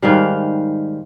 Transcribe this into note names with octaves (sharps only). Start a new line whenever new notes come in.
G#2 D#3 G3 F5